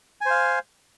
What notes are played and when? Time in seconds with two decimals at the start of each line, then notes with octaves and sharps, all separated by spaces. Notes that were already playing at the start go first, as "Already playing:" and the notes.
0.21 G#5
0.26 C5
0.31 F5